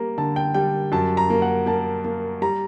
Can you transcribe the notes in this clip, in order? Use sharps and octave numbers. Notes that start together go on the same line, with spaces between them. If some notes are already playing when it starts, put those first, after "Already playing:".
Already playing: G3 A#3 A#5
D3 A5
G5
G3 G5
F#2 A5
A#5
A#3
F#5
A#3 A5
A#3
G3 A#5